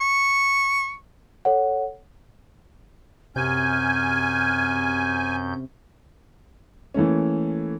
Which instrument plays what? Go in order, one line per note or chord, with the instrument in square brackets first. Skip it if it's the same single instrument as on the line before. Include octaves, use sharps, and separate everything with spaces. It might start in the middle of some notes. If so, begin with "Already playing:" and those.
[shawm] C#6
[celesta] A4 C#5 F#5
[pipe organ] F#2 G6 [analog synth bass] C3 [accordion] G#5 [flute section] F6 G#6
[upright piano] E3 A3 A#3 C#4